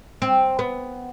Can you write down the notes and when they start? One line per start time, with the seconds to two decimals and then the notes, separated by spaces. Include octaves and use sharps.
0.22 C4
0.59 B3